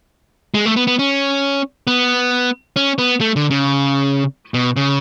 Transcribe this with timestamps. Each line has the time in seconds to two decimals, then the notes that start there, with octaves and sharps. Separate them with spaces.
0.54 G#3
0.66 A3
0.76 B3
0.87 B3
0.99 C#4
1.87 B3
2.76 C#4
2.98 B3
3.21 A3
3.36 D3
3.50 C#3
4.54 B2
4.76 C#3